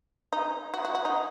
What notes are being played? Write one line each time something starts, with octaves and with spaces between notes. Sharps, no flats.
D#4
F#4
F#4
F#4
D#4